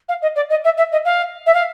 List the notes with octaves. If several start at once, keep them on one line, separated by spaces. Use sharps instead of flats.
F5
D#5
D5
D#5
E5
E5
D#5
F5
E5
F5